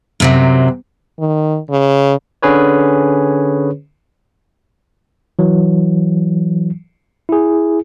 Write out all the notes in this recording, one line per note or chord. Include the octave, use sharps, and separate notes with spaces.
F#2 C3 F#3
D#3
C#3
D3 C#4 G#4 B4 C#5
E3 F#3
E4 G#4